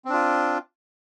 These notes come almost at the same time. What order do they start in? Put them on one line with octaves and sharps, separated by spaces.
C4 D4 F4